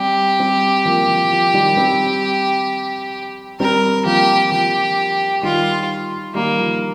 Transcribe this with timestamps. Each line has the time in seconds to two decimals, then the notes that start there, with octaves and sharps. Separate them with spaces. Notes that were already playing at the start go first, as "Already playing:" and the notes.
Already playing: G3 C4 G4
0.39 G3 C4
0.85 F3 A#3
1.08 F3
1.31 F3
1.54 D#3 G3
1.77 G3 C4
3.60 G3 C4 A#4
4.06 F3 A#3 G4
4.52 F3 G4
5.43 D#3 G3 F4
6.34 D#3 G3 A#3
6.58 F3